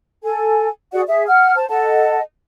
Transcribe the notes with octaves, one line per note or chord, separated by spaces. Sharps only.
A4 G#5
F#4 G#4 D5 F#5
G#4 E5
F#5 F6
C5 A5
A4 D#5 F#5 A5